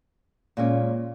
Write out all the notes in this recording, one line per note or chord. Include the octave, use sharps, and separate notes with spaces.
A#2 G#3 C#4